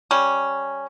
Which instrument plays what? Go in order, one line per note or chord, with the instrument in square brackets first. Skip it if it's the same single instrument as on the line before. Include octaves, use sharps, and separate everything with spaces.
[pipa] G3 C#4